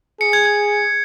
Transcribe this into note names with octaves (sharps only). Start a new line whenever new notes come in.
G#4 C#7
G#6
G#6